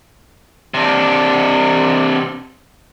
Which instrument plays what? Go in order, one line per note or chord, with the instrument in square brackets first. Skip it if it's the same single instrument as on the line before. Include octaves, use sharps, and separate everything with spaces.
[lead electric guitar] C3 D4